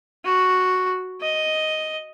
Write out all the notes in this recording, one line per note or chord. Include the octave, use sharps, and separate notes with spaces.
F#4
D#5